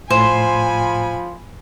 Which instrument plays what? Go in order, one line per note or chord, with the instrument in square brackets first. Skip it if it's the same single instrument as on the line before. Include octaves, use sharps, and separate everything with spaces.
[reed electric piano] A2 [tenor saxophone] F3 [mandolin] C5 [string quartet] G#5 B5